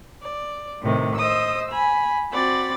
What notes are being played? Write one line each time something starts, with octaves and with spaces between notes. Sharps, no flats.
D5
A2 C3 D#3
C5 D#5 D#6 E6
G#5 B5
C4 F#4 D5 B5 A6